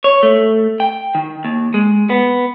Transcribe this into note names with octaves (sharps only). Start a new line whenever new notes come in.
C#5
A3
G5
D#3
D#2
G#3
B3